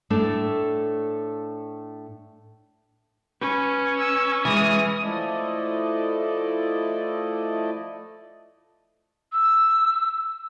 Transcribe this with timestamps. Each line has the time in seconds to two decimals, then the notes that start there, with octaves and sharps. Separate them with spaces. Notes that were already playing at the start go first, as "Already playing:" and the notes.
0.10 A2 A3 D4
3.41 C#4 B4
3.98 E6
4.45 E3 G#3 G#5 D#6 F6
5.04 F3 A3 E4 A4 D5 D#5
9.33 E6